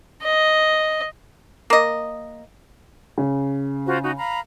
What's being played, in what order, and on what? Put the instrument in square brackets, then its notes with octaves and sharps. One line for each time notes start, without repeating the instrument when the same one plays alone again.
[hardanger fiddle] D#5
[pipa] A#3 D#5
[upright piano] C#3
[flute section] F4 F#4 C5
D#4 F#4
F5 A#5 B5